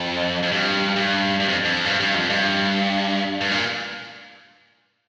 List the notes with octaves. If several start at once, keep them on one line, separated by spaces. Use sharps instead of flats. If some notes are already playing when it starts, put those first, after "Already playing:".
Already playing: F2
F2
G2
G2
G2
F2
F2
G2
G2
F2
G2
G2
A#2